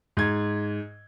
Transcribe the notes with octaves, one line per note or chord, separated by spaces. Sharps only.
G#2 G#6